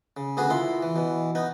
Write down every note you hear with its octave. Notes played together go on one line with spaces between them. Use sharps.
C#3
D2 C#3 B3 F#4 G#4
A#2 E4 C6
E3
B2 E3
B3 D#4